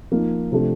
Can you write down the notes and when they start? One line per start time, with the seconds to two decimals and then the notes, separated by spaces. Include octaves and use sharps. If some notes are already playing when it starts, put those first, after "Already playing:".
0.11 F3 A#3 D#4
0.52 C3 F3 A3 D4 A4